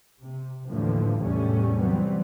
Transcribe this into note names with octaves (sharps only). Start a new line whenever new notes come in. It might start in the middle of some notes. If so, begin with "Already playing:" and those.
C3
D#2 A2 D3 E3 F3
E2 A2 C3 G3 A3 C#4
C3 E3 F#3 G3 B3 C4